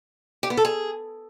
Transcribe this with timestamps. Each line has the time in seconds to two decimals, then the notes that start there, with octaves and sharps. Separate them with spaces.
0.43 G4
0.50 B3
0.57 A4
0.65 G#4